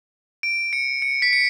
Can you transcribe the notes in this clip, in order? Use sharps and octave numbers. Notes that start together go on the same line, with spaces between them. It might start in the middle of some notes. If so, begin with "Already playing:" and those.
D7
C#7
C#7
B6
C#7